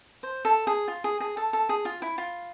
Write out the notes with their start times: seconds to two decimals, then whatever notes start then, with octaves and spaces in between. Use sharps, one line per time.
0.23 C5
0.45 A4
0.67 G#4
0.88 F4
1.04 G#4
1.20 G#4
1.37 A4
1.53 A4
1.69 G#4
1.85 F4
2.02 E4
2.18 F4